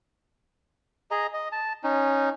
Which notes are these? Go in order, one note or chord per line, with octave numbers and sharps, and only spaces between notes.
G#4 D#5 A#5
D#5
A5
C#4 D#4